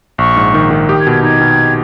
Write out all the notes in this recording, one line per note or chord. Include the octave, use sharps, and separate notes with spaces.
A#1 C#6
G#2
D#3
D#3
G4 D#6
G#6
B2
G#6
D#4 G#6
B2